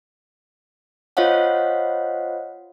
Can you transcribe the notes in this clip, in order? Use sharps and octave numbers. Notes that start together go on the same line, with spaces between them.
F4 C5 C#5 D#5 F5 F#5